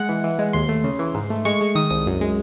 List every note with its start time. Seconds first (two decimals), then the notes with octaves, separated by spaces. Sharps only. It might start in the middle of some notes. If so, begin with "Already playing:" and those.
Already playing: G#3 F#5
0.09 E3
0.24 E3
0.39 G#3
0.53 D#2 C6
0.69 A3
0.84 C#3
0.99 E3
1.15 G#2
1.30 A3
1.45 G#3 C#6
1.61 G#3
1.75 D#3 D#6
1.90 C2 D#6
2.06 F#2
2.21 G#3